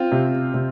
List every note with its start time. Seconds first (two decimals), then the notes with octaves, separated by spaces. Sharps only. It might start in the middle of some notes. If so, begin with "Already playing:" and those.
Already playing: C4 F4
0.12 C3
0.54 C3